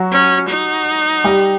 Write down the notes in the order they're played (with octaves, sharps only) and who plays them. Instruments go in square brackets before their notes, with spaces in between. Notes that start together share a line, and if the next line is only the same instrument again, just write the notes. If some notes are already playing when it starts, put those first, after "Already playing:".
Already playing: [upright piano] F#3 F#4
[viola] C#4
D#4
[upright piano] G3 G4